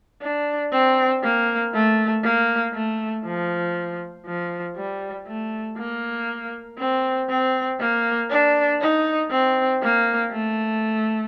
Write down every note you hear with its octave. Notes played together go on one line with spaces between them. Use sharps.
D4
C4
A#3
A3
A#3
A3
F3
F3
G3
A3
A#3
C4
C4
A#3
D4
D#4
C4
A#3
A3